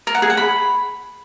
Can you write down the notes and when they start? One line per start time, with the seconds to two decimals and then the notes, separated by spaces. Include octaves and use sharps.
0.07 A#4
0.15 F#5
0.22 G#4
0.30 F#5
0.37 B5